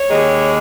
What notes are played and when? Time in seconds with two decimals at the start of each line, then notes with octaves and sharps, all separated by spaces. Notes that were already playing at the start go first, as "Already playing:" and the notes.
Already playing: C#5
0.08 D#2 D#3 G#3